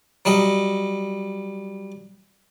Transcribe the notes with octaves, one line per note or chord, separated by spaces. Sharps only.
F#3 G3 D#5